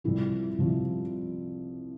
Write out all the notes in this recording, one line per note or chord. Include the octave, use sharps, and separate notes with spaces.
C2 C3 F3 E4
C2 C3 F3